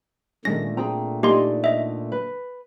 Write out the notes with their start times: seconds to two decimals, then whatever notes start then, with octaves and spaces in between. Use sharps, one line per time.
0.45 A#2 D3 D#3 G#3 A3 C#4 A#6
0.77 C4 G#4 G5 A#5
1.23 A#3 D#4 G4 D5 D#5 G#5 C6
1.64 D#5 E5
2.12 B4